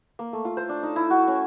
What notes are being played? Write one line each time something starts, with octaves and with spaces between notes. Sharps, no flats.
A#3
A3
F4
C5
D4
D#4
E4
F#4
C#4